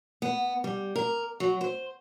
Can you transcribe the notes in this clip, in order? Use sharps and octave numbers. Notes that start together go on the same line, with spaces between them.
B3
G3
A#4
F#3
C5